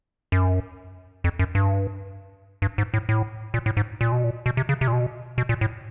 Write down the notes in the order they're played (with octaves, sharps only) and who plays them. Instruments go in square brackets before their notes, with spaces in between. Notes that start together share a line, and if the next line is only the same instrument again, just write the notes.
[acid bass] F#2
F2
F#2
G2
G2
G#2
A2
A2
A#2
A2
G#2
A#2
B2
A#2
B2
C3
C#3
C3
A#2
B2
B2
A#2
A2